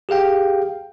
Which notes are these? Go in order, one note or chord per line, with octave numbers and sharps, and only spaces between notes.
G4 G#4 F5 G5